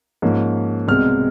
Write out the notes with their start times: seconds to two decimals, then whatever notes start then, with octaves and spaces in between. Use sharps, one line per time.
0.22 G#2 F3 A#3 C#4
0.88 C2 B2 G#3 C4 F6